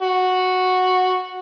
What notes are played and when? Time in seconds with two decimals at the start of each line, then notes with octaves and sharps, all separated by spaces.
0.02 F#4